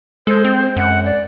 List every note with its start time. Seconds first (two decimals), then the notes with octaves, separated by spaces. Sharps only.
0.27 G#3 A4 C5 G6
0.44 C4
0.76 F#2 F#5
1.04 D5